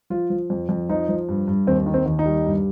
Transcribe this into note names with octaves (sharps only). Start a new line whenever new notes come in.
F3 F4
F3
F2
F2
F3 D#4
F3
G2
G2
D#2 C4
D#3
C4
D#2
D#4
G3
G2